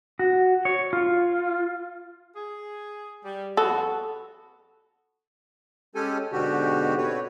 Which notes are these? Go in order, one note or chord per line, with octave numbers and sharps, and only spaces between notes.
F#4
C#5
F4
G#4
G3
F2 B3 F#4 A4
G#3 C#4 G4 A4 G#5
G#2 B2 D3 F#4 G4
C4 F#4 B4 C#5